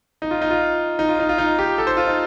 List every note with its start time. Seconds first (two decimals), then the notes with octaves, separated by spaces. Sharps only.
0.22 D#4
0.31 F4
0.41 D#4
0.50 F4
0.99 D#4
1.09 F4
1.20 D#4
1.29 F4
1.38 D#4
1.58 G4
1.78 A4
1.87 C5
1.97 F4
2.07 D#4